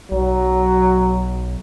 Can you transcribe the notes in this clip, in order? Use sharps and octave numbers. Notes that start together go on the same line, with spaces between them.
B1 F#3